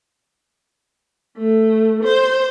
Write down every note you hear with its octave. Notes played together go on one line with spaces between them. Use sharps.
A3
C5